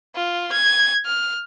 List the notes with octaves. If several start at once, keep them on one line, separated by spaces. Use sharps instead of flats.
F4
G#6
F6